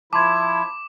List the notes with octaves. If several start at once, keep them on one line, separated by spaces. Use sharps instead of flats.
F3 E4 A5 C6 D6 G#6